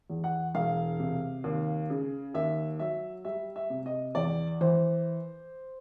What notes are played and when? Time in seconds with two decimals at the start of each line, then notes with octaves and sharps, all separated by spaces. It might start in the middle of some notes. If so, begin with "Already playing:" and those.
0.10 E2
0.24 F#5
0.55 E1 F5
1.00 C3
1.44 D#2
1.90 C#3
2.34 D#2 E5
2.79 F#3 E5
3.24 G3 E5
3.56 E5
3.70 C3
3.86 D#5
4.15 E2 D5
4.61 E3 C5